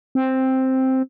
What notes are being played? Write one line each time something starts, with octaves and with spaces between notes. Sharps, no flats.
C4